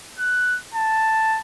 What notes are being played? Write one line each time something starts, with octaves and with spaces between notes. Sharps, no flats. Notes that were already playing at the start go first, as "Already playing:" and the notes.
F#6
A5